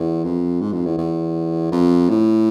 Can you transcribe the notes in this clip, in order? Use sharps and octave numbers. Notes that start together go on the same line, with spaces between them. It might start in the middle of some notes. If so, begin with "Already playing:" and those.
Already playing: E2
F2
G#2
F2
E2
E2
F2
A2